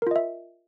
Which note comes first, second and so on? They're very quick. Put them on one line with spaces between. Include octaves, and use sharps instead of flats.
A#4 F4 D#5 E5